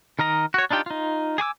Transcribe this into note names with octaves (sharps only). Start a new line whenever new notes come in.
D#3 A#4 D#5 A#5
F#4 C#5
D4 D#4 F4 G4 G5
D#4 F4
G#4 G#5 D6 E6